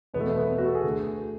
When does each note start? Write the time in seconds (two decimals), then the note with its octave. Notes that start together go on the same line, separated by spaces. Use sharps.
0.14 E2 B2 B3
0.20 A3
0.26 B3
0.37 B3
0.48 B3
0.58 F#4
0.66 A4
0.75 G#4
0.83 D2 D3